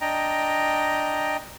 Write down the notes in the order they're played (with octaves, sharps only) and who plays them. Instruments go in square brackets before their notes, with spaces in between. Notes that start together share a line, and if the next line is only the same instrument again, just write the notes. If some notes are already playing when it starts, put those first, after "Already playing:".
[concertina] D4 D#5 G5 A#5